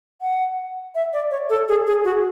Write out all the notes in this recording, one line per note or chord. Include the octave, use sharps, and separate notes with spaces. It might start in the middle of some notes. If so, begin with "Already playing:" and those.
F#5
E5
D5
C#5
A4
G#4
G#4
F#4